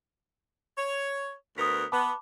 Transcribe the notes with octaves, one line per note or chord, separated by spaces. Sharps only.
C#5
D2 B3 A#4 D#6 B6
B3 A5 B5 D6